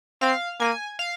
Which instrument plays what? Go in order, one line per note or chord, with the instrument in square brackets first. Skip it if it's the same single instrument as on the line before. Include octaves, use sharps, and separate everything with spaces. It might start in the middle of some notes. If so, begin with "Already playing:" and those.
[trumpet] C4 [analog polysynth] F5
[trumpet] A#3 [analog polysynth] G#5
[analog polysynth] F5